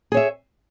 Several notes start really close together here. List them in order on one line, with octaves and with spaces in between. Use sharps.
G#4 C#5 E5